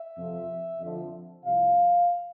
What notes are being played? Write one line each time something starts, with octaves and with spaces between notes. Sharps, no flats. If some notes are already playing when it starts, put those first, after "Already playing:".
Already playing: E5
F2 C3 F3
F2 D3 F3
C2 C3 F3 F5